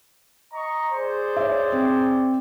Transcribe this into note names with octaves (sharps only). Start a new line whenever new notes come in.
D#5 A#5 C#6
G#4 C5 D5
C#5 E5
C4